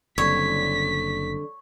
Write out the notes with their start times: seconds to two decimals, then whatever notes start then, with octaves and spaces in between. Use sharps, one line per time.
0.18 F#1 D3 G3 C4 C#5 B6